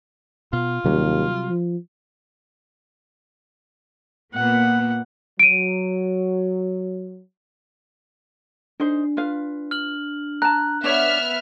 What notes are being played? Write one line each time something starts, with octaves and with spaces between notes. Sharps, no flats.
B2 F4
D#2 C3 F#3 G3
F3
A#2 A#3 B3 F#5
F#3 D7 D#7
D4 D#4 C5
F4 B4 F5
F6 F#7
A5 A#5 F#6
B3 D4 C#5 E5 F6